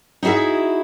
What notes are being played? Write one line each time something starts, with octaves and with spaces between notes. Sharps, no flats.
D#4 E4 F#4 G#4 E5